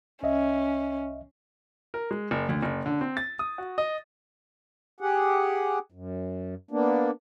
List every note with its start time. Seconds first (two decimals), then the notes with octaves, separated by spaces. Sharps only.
0.23 C2 C#4 D#5 E5
1.94 A#4
2.11 G#3
2.31 F#1
2.49 D2
2.63 F#1
2.86 D3
3.01 C4
3.17 A6
3.39 D#6
3.58 F#4
3.78 D#5
5.01 G4 G#4 F#5
5.92 F#2
6.71 A#3 B3 D4